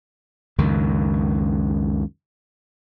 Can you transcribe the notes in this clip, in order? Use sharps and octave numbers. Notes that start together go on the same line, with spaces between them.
C#2 F#2 D#3